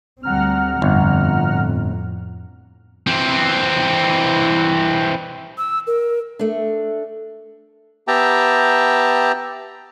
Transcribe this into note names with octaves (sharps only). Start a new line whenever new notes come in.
D2 G3 C4 F#5 A#5 F6
G1 F2 A2
E3 C4
E6
A#4
A3 D4
B3 G4 E5 G5 A5 A#5